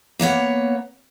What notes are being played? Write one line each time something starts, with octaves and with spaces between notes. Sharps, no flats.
A#3 B3 C#5 F#5